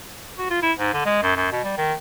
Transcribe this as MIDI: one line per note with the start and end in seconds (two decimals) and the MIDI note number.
0.38 0.47 66
0.50 0.61 65
0.62 0.72 64
0.78 0.93 44
0.94 1.03 50
1.05 1.22 56
1.23 1.32 42
1.36 1.48 42
1.52 1.62 47
1.64 1.76 55
1.77 1.94 51